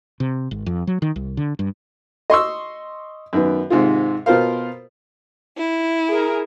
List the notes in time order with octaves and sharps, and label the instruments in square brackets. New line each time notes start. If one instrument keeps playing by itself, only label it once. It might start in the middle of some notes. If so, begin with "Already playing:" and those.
[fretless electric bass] C3
G#1
F2
F#3
D#3
C2
D3
G2
[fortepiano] D#5 C6 C#6 E6
F#2 D#3 B3
G#2 C3 D#3 F4
B2 F4 A#4 C5 F5
[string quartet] E4
[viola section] G#4 A#4